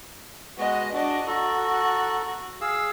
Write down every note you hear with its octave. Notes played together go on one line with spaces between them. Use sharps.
G#3 B3 F#4 D#5
D4 F#4 D#5
F#4 A4 A#5
G#4 F5 E6